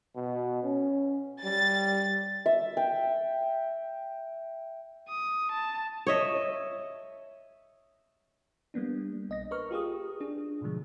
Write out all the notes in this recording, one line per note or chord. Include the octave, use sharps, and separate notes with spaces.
B2
C#4
G3 A6
E5
G5
D#6
A5
C#5 D#5 E5
G3 A#3 B3 D4
B1 D#5 A#6
A#4 B4 C#6 F6
F4 G4 G#4 D#6
D4 G#4
G#2 B2 D3 F3 G#3